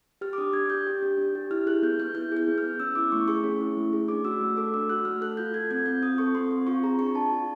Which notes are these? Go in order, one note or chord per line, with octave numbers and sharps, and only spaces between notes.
G4 F6
D6
D4 D#6
D4 G#6
G4 G6
G4
D4
D4
G4
E4 F6
G#4 F#6
B3 G6
B3 G6
E4 G6
G#4 G6
B3
F6
B3
C#4 E6
E4 D6
A3 C#6
G#4 C#6
C#4
E4
A3
G#4
D4 D6
F#4 E6
A3
A4 D6
D4 E6
F#4 F#6
A3 F6
A4 F#6
F4 G6
A4 G#6
C4 G#6
C4 G6
F4 D#6
A4 C#6
C4 C6
C4
F4 C#6
G#4 A#5
D4 C#6
D4 A5
F4